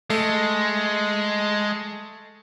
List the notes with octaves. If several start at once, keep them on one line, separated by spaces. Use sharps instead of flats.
G#3 A3